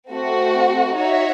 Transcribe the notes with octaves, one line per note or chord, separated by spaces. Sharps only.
A3 C4 F#4
D#4 F#4 C#5 E5